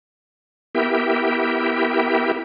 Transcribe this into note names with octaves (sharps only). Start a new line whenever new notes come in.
B3 E4 G4 A#4 E5 G5